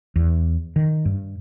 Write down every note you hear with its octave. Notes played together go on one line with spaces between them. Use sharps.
E2
D#3
G2